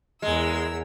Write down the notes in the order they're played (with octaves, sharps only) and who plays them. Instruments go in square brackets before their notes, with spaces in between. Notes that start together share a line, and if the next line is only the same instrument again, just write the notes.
[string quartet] E2 A#4 E6 [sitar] G#3